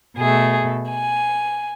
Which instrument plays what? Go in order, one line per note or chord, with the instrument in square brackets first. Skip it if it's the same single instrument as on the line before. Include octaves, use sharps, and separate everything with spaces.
[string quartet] B2 A3 G#4
G#5